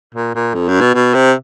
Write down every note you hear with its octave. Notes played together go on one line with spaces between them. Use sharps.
A#2
A#2
F2
F#2
B2
B2
C3